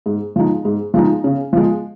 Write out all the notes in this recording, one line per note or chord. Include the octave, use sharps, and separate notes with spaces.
G#2
F3 G#3 D#4
G#2
F3 G#3 D#4
C#3
F3 G#3